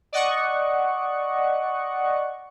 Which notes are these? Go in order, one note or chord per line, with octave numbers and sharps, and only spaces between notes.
D5 D#5 F#5 C#6